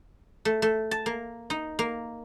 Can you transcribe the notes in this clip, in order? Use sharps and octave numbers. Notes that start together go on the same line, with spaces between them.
A3
A3
A5
A#3
D#4
A#3